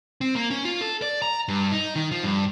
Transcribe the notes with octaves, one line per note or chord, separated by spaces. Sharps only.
C4
A#3
C#4
F4
A4
D5
A#5
G2
D#4
D#3
F3
G2